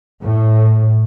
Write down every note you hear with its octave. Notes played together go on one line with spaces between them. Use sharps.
A2